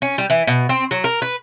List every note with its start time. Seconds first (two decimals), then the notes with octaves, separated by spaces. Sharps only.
0.02 C#4
0.18 G3
0.30 E3
0.47 B2
0.69 C4
0.91 F#3
1.04 A#4
1.22 B4